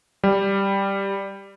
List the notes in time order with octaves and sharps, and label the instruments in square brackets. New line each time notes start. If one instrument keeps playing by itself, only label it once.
[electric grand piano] G3